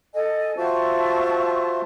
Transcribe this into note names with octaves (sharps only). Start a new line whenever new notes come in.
A4 D#5 G#5
F4 F#4 C5 E5 A5 C#6